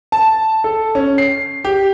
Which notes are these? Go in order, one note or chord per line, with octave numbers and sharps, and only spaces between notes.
A5
A4
C#4
C7
G4